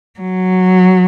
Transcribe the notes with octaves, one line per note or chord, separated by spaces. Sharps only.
F#3